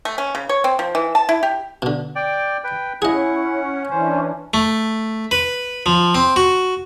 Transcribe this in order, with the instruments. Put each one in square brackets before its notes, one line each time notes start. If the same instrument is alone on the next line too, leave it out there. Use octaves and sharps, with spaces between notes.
[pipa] A3
C#4
C#3
C#5
C4
F3
E3
A5
E4
G4
[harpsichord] B2 D3
[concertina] D5 G5
B4 G5
[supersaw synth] C#4 [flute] E4 [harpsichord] G#4 D#5 [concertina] F#5
[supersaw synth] E3 C#4 D4 [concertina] C5 [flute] G#5
[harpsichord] A3
B4
F3
C4
F#4